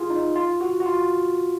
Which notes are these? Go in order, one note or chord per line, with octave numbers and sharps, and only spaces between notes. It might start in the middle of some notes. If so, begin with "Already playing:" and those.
Already playing: F4 G#4
D#4
F4
F#4
F#4
F4